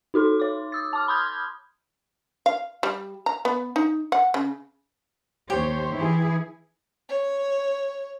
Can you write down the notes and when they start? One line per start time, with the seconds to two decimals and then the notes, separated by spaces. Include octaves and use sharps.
0.14 D#4 F#4 A4 C6
0.40 C#5 D6
0.72 D#6 E6 A6
0.93 A5 D6 F6
1.08 B5 C6 D#6 F6 G6 G#6
2.46 F5
2.83 G3
3.26 A#5
3.45 B3
3.76 D#4
4.12 F#5
4.34 C#3
5.50 D#2 G4 C5 C#5
5.96 E3 E4 G#4
7.09 C#5